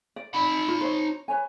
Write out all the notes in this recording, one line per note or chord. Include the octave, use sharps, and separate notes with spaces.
D5
D#4 B5
F4
C5 C#5
B4 C#5 G#5